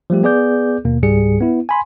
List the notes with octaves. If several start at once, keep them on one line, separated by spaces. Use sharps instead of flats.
F3 G3 A3 G4
B3 G#4 D5 D6 G6
D#2 B2 A#3
C#2 G#2 G3 G#4 C#7
B3 E4
G#5 B5 C6